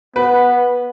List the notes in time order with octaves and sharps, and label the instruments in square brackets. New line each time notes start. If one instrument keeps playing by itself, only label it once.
[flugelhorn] B3 [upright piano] B4